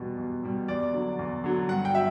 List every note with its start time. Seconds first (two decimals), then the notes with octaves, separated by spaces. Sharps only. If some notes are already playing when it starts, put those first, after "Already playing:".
Already playing: E2 B2 G3
0.18 E2
0.43 B2 G3
0.68 E2 D5
0.93 D3 F#3
1.19 E2
1.44 D3 F#3
1.69 G2 F#5
1.85 G5
1.93 F#3 E5